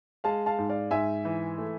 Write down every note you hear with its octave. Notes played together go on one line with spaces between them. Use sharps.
G#3 F5 A5
F5 A5
G#2
D5 F5
G#2 E5 G#5
E3
A3